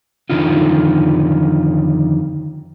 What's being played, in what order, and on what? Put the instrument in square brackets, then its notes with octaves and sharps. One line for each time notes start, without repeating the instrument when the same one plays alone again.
[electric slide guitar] F2 A#2 D3 D#3 D#4 F4